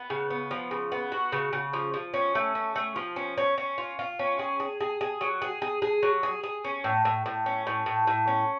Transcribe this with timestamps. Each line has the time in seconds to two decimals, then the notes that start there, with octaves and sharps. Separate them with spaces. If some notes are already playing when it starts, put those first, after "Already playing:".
Already playing: B3
0.10 C#3
0.30 B3
0.51 F3
0.71 C#3
0.92 B3
1.12 F#4
1.32 C#3
1.53 C#3
1.73 F3
1.94 F3
2.14 C#4
2.35 A3
2.55 C#4
2.76 A3
2.96 F3
3.16 C#4
3.37 C#4
3.58 C#4
3.78 F4
3.99 F4
4.19 C#4
4.39 G#4
4.60 G#4
4.80 G#4
5.01 G#4
5.21 F#3
5.42 G#4
5.62 G#4
5.82 G#4
6.03 F#3
6.23 G#4
6.43 G#4
6.64 C#4
6.84 A2
7.05 A2
7.26 A2
7.46 C#4
7.67 A2
7.86 A2
8.07 A2
8.27 C#4